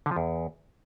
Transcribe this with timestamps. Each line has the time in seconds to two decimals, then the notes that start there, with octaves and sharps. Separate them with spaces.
0.06 D3
0.11 F3
0.16 E2